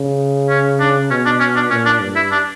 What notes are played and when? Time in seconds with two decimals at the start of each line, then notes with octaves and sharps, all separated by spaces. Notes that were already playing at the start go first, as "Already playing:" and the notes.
Already playing: C#3
0.49 C#4
0.80 D4
1.11 B2 C#4
1.25 D4
1.40 C#4
1.56 D4
1.70 A#2 C#4
1.86 D4
2.01 G2
2.16 E4
2.32 D4